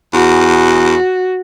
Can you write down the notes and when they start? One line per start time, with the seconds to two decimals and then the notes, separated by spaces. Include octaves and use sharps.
0.14 E2 F#4